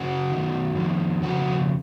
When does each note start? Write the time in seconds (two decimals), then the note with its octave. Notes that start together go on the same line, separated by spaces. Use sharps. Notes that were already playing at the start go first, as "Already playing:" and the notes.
Already playing: F#2 C#3 F#4
0.31 F#2 D#3
0.76 F2 D#3
1.23 F2 C#3 F#4